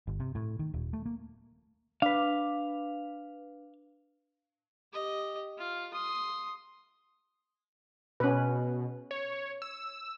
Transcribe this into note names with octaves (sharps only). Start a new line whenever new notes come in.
G1
C3
A2
D#3
D#1
A3
A#3
D4 B4 F5
G4 D#5
F4
C6 D#6
B2 C#4 B4
C#5
E6